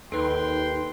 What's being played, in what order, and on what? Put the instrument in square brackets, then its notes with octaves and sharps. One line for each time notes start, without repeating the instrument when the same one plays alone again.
[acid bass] D#2 [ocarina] D#4 [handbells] A4 B4 [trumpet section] G5 C6